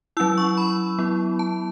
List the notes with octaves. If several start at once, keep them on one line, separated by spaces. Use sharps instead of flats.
F#3 C#4 E4 E6
C#6
B5
F#3 B3 E4
A5